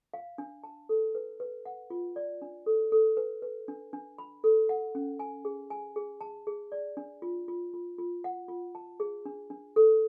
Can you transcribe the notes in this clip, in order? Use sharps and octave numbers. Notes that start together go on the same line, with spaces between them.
F5
D4
A5
A4
B4
B4
F#5
F4
D5
D4
A4
A4
B4
B4
D4
D4
B5
A4
F#5
C#4
G#5
G#4
G#5
G#4
A5
G#4
D5
D4
F4
F4
F4
F4
F#5
F4
A5
G#4
D4
D4
A4